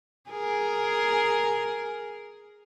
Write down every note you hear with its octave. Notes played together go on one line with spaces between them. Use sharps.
G#4 A#4